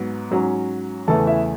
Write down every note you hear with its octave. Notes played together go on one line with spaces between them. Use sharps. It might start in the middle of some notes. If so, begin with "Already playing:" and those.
Already playing: G#2 F#3 B3
G#2 F#3 C#4
E2 C#3 E3 A3 A4 A5
E4 E5